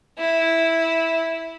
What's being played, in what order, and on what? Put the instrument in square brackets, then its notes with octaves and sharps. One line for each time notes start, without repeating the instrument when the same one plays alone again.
[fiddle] E4